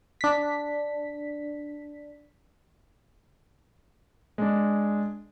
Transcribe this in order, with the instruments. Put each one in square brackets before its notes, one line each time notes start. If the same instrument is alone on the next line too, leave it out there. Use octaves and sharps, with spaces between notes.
[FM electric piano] D4 B6
[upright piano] G#3 D4